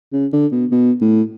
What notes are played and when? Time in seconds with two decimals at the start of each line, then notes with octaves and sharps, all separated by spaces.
0.13 C#3
0.33 D3
0.52 B2
0.72 B2
1.01 A2